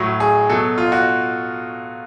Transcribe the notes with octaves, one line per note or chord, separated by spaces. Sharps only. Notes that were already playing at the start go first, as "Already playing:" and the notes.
Already playing: A2 F#3
G#4
B2 F#3 A4
F4
F#4